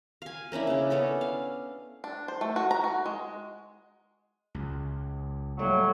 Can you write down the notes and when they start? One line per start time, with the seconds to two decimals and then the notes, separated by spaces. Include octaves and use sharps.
0.22 F5 G#5
0.52 A#3 C#4 D4 E4
0.67 C#3 C#4
0.90 B3 C#4 D4 A4
1.21 F5
2.04 D4
2.28 C5
2.41 A3
2.56 F#4
2.71 A#5
2.84 F#4
3.06 G#3
4.55 C#2
5.59 A2 F#3 G3 A#3